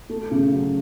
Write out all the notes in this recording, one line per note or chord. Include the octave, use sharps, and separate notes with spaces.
A3
C#3
F#3